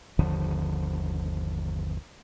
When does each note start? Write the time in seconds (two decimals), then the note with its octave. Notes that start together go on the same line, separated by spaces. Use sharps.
0.19 G1 D#2 D3 F3